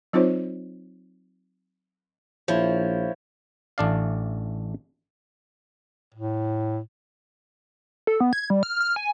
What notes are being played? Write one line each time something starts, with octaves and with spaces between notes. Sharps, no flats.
F#3 C4 D#4 F4 C5 C#5
A#1 F3 E4 C#5
A1 A3 D4 D5 F5
A2
A4
B3
G#6
G3
F6
F6
G#5